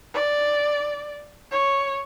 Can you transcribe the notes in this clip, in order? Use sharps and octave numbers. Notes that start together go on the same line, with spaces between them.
D5
C#5